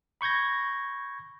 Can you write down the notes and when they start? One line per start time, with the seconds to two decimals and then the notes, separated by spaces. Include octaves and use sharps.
0.21 B5 C#6 G6 G#6 A#6